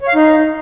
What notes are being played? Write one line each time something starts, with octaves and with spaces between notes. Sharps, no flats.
C#5
F5
D#4